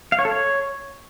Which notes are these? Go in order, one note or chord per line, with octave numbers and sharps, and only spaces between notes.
F5
C#5
A4
C#5